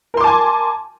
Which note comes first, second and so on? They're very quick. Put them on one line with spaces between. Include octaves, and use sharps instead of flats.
A#4 C6 D6 A5 G#5